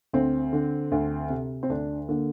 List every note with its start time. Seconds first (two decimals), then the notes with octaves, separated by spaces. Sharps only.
0.13 D2 C4
0.53 D3
0.92 D2
1.30 C3
1.63 C4
1.70 D2 D4
2.08 D3 A#3